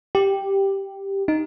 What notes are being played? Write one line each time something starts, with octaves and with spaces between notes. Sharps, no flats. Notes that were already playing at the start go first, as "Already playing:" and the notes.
G4
D#4